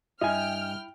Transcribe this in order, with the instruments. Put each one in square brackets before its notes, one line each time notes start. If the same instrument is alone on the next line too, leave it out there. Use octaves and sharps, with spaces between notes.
[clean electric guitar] G2 [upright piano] E4 [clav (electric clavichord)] D#5 G#5 [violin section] G5 F6